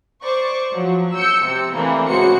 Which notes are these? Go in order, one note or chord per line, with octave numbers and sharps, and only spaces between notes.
C5 D5 C#6
F3 F#3
E6 G6 C#7
C3 C4
E3 A3 A#3 C4 D4
C#2 F#4 C5 C#7